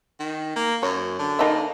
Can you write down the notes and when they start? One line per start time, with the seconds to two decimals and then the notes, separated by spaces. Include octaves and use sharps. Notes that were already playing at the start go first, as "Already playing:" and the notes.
0.20 D#3
0.56 A#3
0.83 F#2 C#5
1.19 D3
1.39 A#3 D#4 E5